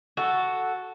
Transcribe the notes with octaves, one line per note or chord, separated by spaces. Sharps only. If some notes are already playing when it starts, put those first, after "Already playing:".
F#4 A4